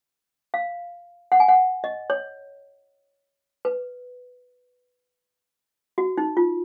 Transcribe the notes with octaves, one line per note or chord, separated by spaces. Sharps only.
F5
F#5
G#5
F#5
D#5
C#5
B4
F#4
D#4
F4